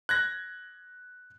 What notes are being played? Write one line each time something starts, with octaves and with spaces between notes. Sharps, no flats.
F#6 G#6 A#6